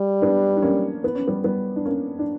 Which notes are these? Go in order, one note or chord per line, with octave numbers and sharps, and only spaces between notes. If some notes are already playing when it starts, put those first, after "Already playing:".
Already playing: G3
B3 D4
D4
A#3 C#4
B3
C#4
G3 B3
G3 B3
D4
A#3 C#4
D4